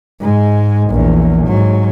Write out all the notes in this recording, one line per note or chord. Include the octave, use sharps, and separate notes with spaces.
G#2 G#3
A#1 E2
G#2 F#3